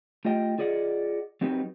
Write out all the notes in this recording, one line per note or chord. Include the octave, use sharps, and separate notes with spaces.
A3 F4 G4 D#5 G5
F4 G#4 D5 D#5 F#5
F#3 C4 D#4 F#4 G4 B4